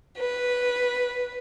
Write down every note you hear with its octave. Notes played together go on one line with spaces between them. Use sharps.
B4